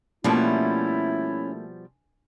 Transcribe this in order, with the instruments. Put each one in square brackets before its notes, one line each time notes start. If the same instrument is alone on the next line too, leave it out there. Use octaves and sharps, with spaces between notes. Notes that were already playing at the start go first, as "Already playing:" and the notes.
[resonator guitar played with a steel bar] B2 F3 G3 [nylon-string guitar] A3 A#3 [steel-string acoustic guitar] C#4 [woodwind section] E4